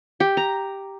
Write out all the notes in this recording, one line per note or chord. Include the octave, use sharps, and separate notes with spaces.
G4
A#5